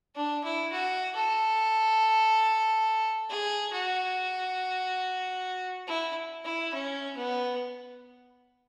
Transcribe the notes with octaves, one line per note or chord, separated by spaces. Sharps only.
D4
E4
F#4
A4
G#4
F#4
E4
E4
C#4
B3